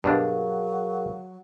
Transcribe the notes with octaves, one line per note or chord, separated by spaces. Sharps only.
G2 B2 F#3 D4 G#4 A#4 F5